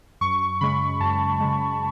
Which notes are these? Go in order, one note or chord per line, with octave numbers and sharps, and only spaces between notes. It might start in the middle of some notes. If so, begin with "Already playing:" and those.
F#2 C#6
C#3 G#3 B5
F#2 A5
C#3 G#3